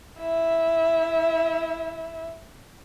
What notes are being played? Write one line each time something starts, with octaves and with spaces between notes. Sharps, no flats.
E4 E5